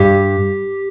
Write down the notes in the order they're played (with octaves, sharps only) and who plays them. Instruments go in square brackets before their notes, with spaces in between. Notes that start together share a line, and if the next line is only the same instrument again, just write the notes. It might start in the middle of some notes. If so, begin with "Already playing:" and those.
Already playing: [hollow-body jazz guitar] G2 [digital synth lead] G4